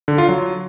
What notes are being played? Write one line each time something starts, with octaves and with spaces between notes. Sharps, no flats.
D3
F4
F#3